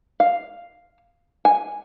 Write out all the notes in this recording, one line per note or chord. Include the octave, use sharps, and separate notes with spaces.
F5
G#5